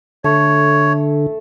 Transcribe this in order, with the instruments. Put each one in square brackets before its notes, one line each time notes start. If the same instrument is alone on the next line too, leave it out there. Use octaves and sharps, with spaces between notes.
[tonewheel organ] D3 [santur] A3 [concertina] C#5